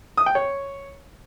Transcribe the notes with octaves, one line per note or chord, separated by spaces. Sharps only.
D#6
G5
C#5